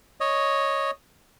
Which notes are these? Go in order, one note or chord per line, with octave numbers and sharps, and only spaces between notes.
C#5 D#5